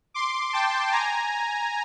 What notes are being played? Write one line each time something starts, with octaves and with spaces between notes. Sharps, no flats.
C6 D6
G5 A5
G#5 A#5